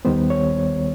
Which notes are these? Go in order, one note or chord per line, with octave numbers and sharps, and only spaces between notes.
D#2 D#3 G3 B3 C5
C#5